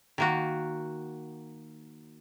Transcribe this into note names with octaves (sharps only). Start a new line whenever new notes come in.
D#3 A#3 F#4